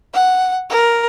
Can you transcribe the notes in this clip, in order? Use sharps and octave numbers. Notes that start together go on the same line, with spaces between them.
F#5
A#4